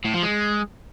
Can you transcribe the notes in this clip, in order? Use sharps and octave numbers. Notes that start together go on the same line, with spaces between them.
A2
F3
G#3